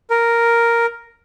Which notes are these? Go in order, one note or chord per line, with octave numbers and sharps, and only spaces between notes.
A#4